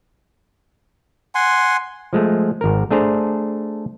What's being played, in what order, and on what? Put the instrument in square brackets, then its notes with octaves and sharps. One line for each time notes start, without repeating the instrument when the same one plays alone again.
[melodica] F#5 G#5 C6
[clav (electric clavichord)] F3 G#3 A3
G#1 A#4
A3 D4 G#4 C5 A#5